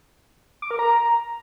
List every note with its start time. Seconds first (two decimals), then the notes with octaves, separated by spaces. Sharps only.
0.62 D6
0.71 A#4
0.79 A#5